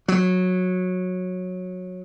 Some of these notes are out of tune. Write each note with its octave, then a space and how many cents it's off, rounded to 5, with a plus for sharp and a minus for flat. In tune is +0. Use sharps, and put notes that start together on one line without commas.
F#3 -15